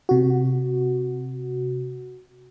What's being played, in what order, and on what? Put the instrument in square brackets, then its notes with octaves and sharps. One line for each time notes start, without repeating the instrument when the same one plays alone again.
[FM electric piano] C3 F#4